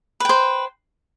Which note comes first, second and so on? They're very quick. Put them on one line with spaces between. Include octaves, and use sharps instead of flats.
B4 G5 C5